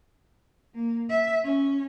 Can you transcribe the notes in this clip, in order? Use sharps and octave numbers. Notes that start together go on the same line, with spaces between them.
A#3
E5
C#4